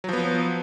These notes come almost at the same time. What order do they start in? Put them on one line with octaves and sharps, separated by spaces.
F#3 F3 B3